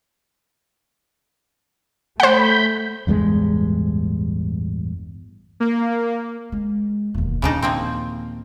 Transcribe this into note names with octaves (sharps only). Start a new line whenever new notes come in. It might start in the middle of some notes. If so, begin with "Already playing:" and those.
A3 C5 F#5 B5 G6
A1 E2 G2 G#3
A#3
G#3
E1 D#2
D#2 A#2 C#3 D4 D#4
F3 A#3 C4